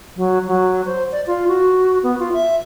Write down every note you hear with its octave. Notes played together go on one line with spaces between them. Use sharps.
F#3
F#3
C5
D5
F4
F#4
B3
F4
E5